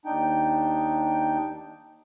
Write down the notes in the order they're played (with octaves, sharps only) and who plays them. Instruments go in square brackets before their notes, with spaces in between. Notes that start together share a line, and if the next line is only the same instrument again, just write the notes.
[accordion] D#2 D4 D#4 G5